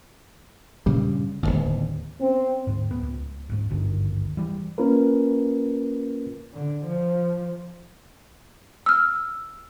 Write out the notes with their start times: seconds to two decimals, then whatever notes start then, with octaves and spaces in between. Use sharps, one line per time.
0.86 G2 A#2 C#3 G3
1.43 D1 G1 D#2
2.20 C4
2.67 D2 G#2
2.91 D1 B3
3.03 C#2
3.50 C2 G#2
3.70 G#1 D2 G2 D#3
4.37 E3 G3
4.78 A#3 C#4 F4 A#4 B4
6.54 D3
6.85 F3
8.86 E6 F6